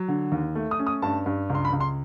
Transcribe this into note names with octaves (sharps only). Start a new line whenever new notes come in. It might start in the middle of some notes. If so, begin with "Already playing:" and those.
Already playing: F#3
D3
D#2
A3
D#6
C#4
D#6
G2 A5
G2
C#2
C6
B5
C#2
C6